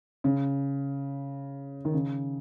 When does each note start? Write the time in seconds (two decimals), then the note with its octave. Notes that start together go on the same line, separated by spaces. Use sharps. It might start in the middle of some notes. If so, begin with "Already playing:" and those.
0.24 C#3
1.85 D#3
1.94 C#3